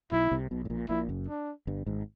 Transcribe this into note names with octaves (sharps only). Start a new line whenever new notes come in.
B1 B2 E4
C2 C3
B1 B2
A2
A#1 A#2
A#1 A#2 E4
F#1 F#2
D4
G1 G2
G#1 G#2